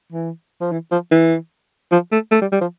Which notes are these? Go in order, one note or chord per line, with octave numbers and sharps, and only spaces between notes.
E3
F3
E3
F3
E3
F3
A3
A3
G3
G3
F3